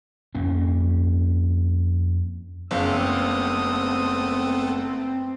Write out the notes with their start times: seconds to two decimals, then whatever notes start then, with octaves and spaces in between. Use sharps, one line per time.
0.35 F2 A#3 C#4
2.71 F#1 A3 B3 C4 A4 F5 D#6